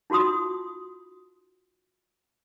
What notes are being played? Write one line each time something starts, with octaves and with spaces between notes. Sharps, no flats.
D#4 F4 F#4 C6 D#6